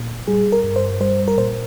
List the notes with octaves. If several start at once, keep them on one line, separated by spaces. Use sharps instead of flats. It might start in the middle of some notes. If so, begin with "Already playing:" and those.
Already playing: A#2
G3 G#4
A#4
G2
C5
G3 C5
A#4
A#2 C5